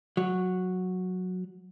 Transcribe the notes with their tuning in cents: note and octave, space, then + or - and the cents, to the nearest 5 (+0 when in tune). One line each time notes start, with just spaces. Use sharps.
F#3 -10